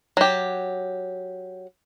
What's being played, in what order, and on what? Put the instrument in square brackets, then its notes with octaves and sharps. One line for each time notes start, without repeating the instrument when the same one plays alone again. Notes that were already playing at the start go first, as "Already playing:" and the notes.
[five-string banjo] F#3 G4